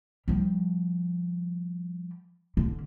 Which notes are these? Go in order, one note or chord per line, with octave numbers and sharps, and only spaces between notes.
F3 G3
D3